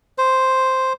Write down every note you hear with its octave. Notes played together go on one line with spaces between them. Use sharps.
C5